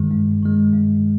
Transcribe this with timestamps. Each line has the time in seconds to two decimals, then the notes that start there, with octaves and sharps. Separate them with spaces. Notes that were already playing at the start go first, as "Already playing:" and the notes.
Already playing: G2 D#3 G#3
0.12 G2
0.42 D#3 G#3
0.73 G2